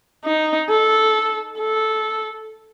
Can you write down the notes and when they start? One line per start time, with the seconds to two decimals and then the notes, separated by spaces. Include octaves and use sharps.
0.25 D#4
0.70 A4
1.59 A4